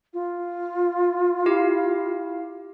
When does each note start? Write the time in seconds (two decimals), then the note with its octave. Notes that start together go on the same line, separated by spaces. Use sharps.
0.14 F4
1.46 E4 G4 F5